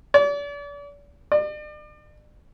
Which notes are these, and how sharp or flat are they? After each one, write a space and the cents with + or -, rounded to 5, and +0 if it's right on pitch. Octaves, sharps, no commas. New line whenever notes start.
D5 -40
D5 +40